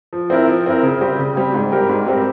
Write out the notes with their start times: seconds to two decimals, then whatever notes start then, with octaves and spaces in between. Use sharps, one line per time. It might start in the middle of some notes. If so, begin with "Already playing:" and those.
0.13 F3
0.30 C4 E4 A#4
0.48 F3
0.66 C4 E4 A#4
0.83 C#3
1.01 G3 C4 G4
1.19 C#3
1.36 G3 C4 G4
1.54 G#2
1.72 G3 C4 G4 A#4
1.89 G#2
2.07 G3 C4 G4 A#4